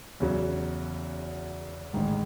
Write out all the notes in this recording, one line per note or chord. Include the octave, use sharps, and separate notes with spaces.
E2 C#3 F#3 C#4
A1 G#2 D#3 G#3